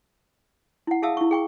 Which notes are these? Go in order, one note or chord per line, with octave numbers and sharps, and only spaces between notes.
E4 F#5
G#4 E5 F5 A5 D#6 E6
E4 C#6
G#4 G5 C#6